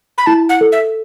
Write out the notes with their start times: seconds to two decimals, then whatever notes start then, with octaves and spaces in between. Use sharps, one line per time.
0.18 B5
0.26 E4 A5
0.49 F#5
0.61 A4
0.72 E5